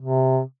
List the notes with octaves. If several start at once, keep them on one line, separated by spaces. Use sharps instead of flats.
C3